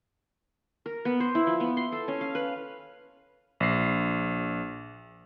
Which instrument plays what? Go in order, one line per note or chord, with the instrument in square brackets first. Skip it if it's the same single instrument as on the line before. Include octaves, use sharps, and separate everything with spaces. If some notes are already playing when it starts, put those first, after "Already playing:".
[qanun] A#4
B3
C5
E4
F3
B3
C6
A4
C#4
F5
B4
[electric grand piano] A#1 C7